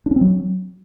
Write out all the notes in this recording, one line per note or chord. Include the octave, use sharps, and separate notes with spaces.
D4
C#4
C4
F#3